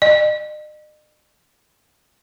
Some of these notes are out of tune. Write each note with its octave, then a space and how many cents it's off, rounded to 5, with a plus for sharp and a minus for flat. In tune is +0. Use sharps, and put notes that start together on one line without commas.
D#5 -45